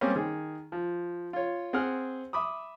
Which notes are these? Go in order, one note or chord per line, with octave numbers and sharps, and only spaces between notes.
G3 G#3 A#3 C4 C#4
D#3 G#4
F3
F4 C#5
C4 G#4 F#5 F6
E5 B5 D6 D#6